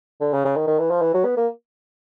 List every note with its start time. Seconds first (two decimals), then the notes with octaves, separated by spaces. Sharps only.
0.21 D3
0.33 C#3
0.45 C#3
0.56 D#3
0.67 D#3
0.79 E3
0.91 F3
1.02 E3
1.14 F#3
1.25 B3
1.37 A#3